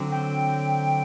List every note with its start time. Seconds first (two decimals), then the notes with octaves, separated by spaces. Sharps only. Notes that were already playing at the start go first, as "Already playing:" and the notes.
Already playing: D3 F#3 C4
0.12 G5